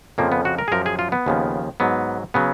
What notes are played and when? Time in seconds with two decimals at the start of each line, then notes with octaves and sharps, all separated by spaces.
0.18 F2 C#3 F3 A#3
0.32 B3
0.45 F#4
0.58 A#4
0.68 G#4
0.72 F#2 F3 A#4
0.86 G#4
0.99 F4
1.12 B3
1.26 D#2 C#3 F3
1.80 G#2 F#3 B3
2.34 C#3 F#3 B3